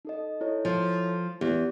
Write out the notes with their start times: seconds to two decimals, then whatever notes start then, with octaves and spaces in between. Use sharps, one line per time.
0.05 D#4 A4 D#5
0.41 E4 A4 C#5
0.65 F3
1.41 E2 G4